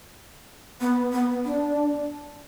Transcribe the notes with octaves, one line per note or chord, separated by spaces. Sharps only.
B3
B3
D4